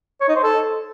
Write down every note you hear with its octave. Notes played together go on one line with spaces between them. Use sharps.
C#5
D#4
C5
A4